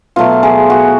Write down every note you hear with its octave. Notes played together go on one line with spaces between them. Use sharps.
B2 F#3 A3 F4
G#4
F#4